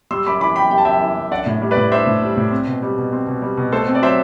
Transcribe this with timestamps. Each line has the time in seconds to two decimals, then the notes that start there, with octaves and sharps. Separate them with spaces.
0.11 G3 C6 E6
0.26 F#2 B5 D6
0.41 E3 B5 D6
0.56 F#2 G5 B5
0.71 G3 G5
0.78 A5
0.85 F#2 E5 G5
1.01 E3
1.17 F#2
1.31 D4 D5 F#5
1.46 A2
1.61 G3
1.71 B4 D5
1.77 A2
1.92 D4 C5 E5
2.06 A2
2.22 G3
2.37 A2
2.51 C4
2.67 B2
2.82 G3
2.98 B2
3.13 C4
3.27 B2
3.42 G3
3.57 B2
3.72 A3 A4 C5
3.88 C4
3.95 D5
4.02 F#3 C5 E5